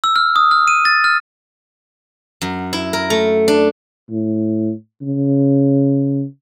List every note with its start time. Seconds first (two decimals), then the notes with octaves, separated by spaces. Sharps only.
0.04 E6
0.16 F6
0.36 D#6
0.51 F6
0.68 D#7
0.85 A6
1.04 F6
2.41 F#2
2.73 E4
2.93 A#4
3.10 A3
3.48 D4
4.10 A2
5.02 C#3